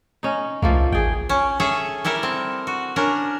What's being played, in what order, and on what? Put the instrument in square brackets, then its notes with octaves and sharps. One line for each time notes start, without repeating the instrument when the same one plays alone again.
[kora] C#4 D#4
[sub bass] C2 [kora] F3 A3 A#3
[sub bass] A1 [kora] G#4 G5
[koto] C#4
C#4 G#4 A4 E5
G3 E4 A4 A#4
C4
F#4
C#4 D4 A#4